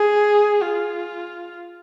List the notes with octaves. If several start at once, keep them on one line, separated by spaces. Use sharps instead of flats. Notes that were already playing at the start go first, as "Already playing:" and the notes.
Already playing: G#4
F4